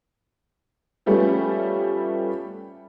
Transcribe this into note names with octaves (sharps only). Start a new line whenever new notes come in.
F3 G3 A3 B3 C#4